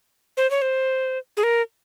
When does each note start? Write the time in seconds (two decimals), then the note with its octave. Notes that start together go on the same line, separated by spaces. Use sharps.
0.37 C5
0.51 C#5
0.62 C5
1.37 G#4
1.43 A#4